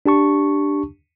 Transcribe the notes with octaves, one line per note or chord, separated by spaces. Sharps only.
D4 G4 A5 C#6